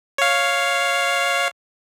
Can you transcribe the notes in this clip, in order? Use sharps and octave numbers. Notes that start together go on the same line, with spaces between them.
C#5 F5